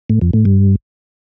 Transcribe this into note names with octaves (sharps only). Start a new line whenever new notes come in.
A2
F2
A2
G2